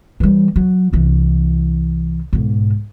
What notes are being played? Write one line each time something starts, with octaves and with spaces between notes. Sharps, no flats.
E3 G3
F#3
C2 E3
B1 G#2